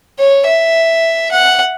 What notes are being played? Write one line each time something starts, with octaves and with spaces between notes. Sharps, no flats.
C#5
E5
F#5